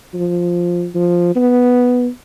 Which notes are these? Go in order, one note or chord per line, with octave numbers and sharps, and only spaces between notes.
F3
F3
B3